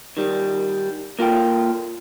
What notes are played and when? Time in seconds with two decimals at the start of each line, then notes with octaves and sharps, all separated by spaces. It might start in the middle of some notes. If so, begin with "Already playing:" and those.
0.17 D#3 G3
1.19 A#3 F4 A4 G5